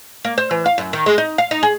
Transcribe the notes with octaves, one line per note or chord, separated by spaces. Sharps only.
A#3
C5
E3
F5
F#2
D#3
G#3
D#4
F5
D#4
G#4